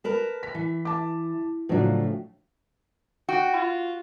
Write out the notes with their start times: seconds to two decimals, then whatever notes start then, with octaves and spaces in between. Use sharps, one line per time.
0.04 A#4 B4 A5
0.43 B6
0.55 E3
0.85 A5 D6
1.69 A2 C#3 F3 F#3 D4
3.29 F#4 G5
3.54 F4